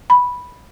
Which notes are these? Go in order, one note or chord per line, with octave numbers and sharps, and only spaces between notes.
B5